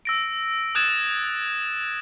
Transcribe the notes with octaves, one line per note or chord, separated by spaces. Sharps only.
E6 A#6 D7
D#6 E6 F#6 G#6 A6 E7